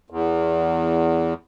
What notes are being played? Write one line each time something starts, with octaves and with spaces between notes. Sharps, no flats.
E2